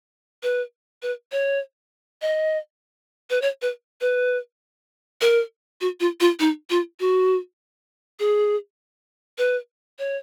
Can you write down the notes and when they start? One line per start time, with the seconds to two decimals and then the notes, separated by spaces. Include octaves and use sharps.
0.43 B4
1.02 B4
1.32 C#5
2.22 D#5
3.30 B4
3.42 C#5
3.62 B4
4.01 B4
5.21 A#4
5.81 F#4
6.00 F4
6.20 F4
6.40 D#4
6.70 F4
7.00 F#4
8.20 G#4
9.38 B4
9.99 C#5